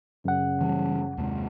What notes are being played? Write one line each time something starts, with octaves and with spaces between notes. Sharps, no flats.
F#2 C#3 F#5
E3 G3
D#2 C3 G#3